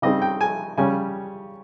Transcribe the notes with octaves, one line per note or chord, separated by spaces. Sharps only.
C#3 G3 C4 D#4 D#5
G5
G#5
C#3 G3 C#4 G#5